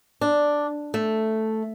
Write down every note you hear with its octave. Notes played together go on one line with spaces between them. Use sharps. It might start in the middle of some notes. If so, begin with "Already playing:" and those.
D4
A3